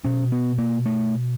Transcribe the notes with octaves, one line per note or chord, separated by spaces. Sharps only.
B2 C#4
B3
A#3
A3